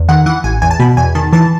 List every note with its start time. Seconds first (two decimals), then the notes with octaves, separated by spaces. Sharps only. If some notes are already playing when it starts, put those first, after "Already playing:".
Already playing: E2
0.09 D#3 F#5
0.26 E3 F#5
0.44 A1 G#5
0.62 E2 G#5
0.71 A5
0.79 B2 B5
0.97 E2 G#5
1.15 D#3 A5
1.33 E3 A5